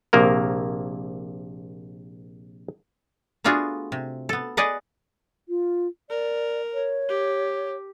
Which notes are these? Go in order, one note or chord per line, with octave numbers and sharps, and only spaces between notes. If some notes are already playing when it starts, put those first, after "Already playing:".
A#1 C3 A#3 A#4
A3 B3 D4 F4 F#4 G#4
C3
B3 A4
G#4 B4 D5 D#5 F#5
F4
A#4 D5
C#5
G4